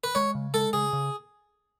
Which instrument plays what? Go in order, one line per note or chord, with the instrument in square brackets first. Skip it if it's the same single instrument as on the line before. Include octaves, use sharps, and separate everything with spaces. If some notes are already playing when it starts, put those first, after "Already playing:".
[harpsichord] B4
[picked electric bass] G#3 [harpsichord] C#5
[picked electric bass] C#3
[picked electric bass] G#3 [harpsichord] A4
[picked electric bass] C#3 [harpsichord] G#4
[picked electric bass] C#3